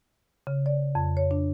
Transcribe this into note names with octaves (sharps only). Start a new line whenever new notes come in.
C#3
D5
F2
C#5
D4